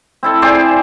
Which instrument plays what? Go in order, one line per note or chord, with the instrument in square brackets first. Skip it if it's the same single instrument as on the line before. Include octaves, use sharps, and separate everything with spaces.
[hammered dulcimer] C4 E4 A4
C4 G#4 C5 D5